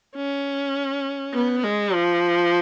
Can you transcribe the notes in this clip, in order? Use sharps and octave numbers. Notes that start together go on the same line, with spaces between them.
C#4
B3
G#3
F3